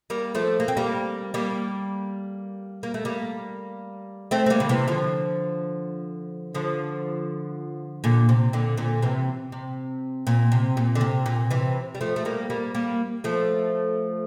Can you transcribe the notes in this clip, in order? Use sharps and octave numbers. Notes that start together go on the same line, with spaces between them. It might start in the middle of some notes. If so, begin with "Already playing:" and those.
G3 A#3
F3 A3
A#3
C4
G3 A#3
G3 A#3
A#3
A3
G3 A#3
A3 C4
C4
G3 A#3
D3
C3 E3
D3 F3
D3 F3
A#2 D3
C3
A#2 D3
A#2 D3
C3 E3
C3
A#2
C3
A#2
D3
C3
A#2
C3 E3
G3
F3 A3
A3
G3 A#3
G3 A#3
G3 A#3
F3 A3